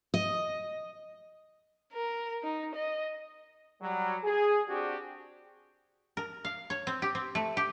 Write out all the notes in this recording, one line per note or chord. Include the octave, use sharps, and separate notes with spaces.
D#5
A#4
D#4
D#5
F#3 G3
G#4
C4 D4 F#4 G4
A#4
F5
C#5
C4
G4
C4
A3
G4